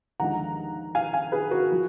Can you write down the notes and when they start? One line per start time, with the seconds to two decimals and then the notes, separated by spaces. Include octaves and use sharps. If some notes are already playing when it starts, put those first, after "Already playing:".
0.20 D#2 D3 F3 G#3 F#5 A#5
0.95 F5 G#5
1.13 F5 G#5
1.32 G#4 B4
1.51 F#4 A#4
1.72 F3